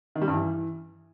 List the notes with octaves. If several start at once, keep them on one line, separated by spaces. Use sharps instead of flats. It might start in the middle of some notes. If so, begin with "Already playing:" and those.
D#3
G3
G2
E3